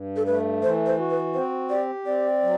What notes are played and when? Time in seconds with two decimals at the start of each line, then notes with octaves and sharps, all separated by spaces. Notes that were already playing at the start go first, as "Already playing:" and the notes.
Already playing: G2
0.16 A4
0.26 A3 B4
0.62 E3 C5
0.86 C5
0.98 F#4
1.10 B4
1.34 C4 C5
1.70 G4 D5
2.06 C4 D5
2.42 F#3